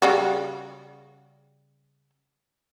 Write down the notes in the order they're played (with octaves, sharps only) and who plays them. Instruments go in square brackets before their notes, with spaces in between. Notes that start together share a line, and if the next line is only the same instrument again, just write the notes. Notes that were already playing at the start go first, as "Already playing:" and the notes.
[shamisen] C#3 G3 F#4